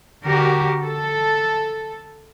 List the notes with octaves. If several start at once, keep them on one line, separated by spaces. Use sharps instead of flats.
D3 F#4 G4 A#4
A4